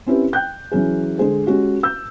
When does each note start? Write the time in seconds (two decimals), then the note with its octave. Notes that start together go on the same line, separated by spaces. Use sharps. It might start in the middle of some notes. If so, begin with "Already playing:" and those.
0.07 C4 C#4 E4 G4 B4
0.33 G5 F#6 G6
0.71 E3 F#3 C#4 G#4
1.18 D3 G#3 G#4 C5
1.46 G#3 C#4 F#4 G4
1.83 E6 G6